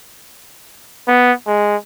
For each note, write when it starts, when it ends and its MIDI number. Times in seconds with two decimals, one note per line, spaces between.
1.07 1.32 59
1.47 1.77 56